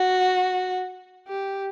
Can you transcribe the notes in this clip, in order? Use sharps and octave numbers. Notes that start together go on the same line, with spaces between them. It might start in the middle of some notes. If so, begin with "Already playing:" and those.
Already playing: F#4
G4